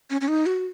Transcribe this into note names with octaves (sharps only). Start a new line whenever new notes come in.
C#4
C#4
D#4
F#4